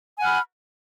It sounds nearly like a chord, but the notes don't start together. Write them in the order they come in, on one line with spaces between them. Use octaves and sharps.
G#5 F#5 F6 B5